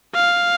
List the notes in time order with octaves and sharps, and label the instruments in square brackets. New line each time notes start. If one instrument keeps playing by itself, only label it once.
[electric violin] F5